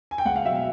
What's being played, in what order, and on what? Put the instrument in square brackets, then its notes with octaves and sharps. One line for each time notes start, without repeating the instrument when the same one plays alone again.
[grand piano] G#5
G5
C#2 F#5
F5
B2 F#3 E5
F5